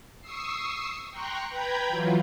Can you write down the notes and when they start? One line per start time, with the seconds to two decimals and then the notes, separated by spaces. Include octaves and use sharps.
0.21 C#6 D#6 E6 C7
1.12 G5 A#5 C6 C#6 F#6
1.50 B4 G5 A#5 B5 G6 G#6
1.88 E3 F#3 F4